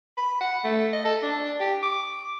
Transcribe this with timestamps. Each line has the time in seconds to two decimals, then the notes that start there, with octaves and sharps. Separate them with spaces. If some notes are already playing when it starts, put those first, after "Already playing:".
0.17 B5
0.41 F#5
0.64 A3
0.93 D#5
1.05 A4
1.22 D4
1.60 G4
1.83 D6